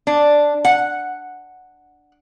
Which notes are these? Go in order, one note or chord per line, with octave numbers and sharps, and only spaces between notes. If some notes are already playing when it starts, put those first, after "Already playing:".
D4
F#5